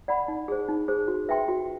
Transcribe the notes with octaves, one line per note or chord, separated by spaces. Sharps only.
D5 F#5 B5
D#4
G#4 C5
D#4
G#4 C5
F#4
B4 E5 G5 C6
F#4